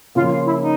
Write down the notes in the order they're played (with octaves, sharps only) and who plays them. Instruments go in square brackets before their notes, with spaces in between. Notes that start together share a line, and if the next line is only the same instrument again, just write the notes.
[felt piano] C#3 F3 A#3 [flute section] F4
[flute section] F4
E4
D#4